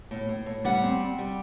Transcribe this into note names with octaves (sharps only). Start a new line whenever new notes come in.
A2
A2
A2
G3 F#5
C4
C4
G3